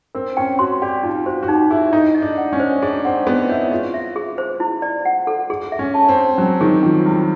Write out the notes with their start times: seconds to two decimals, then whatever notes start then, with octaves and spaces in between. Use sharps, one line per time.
0.15 C4 A#4
0.37 C#4 G5
0.59 F#4 C6
0.82 G4 D5
1.03 D#4 F4
1.26 F#4 C5
1.43 F#4
1.48 D#4 G4
1.71 E4 G#4
1.93 D#4 A4
2.15 D#5
2.22 D4
2.38 F#5
2.53 C#4
2.60 C5
2.82 D4 G#4
3.05 C4 F#5
3.27 B3 G#4
3.49 E4 C#5
3.71 F4 G#4
3.94 E5
4.16 G#4
4.38 C5
4.60 E4
4.82 D5
5.05 F#5
5.27 A4
5.50 G#4
5.72 E5
5.79 C#4
5.94 A5
6.09 C4
6.16 C#5
6.38 F#3 C#4
6.61 D#3 G#4
6.83 F3 C#4
7.05 G3 E4